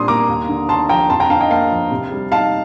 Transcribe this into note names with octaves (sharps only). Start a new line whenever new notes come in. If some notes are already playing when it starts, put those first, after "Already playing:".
Already playing: A#2 G3 C4 D4 C6 D#6
A#3 A#5 D6
D#2
D3
D#2 A5 C6
F3 G5 A#5
F2 A5 C6
G5 A#5
D3 F5 A5
D#5 G5
A#3 F5 A5
F3
C3
G3
D#4 F5 A5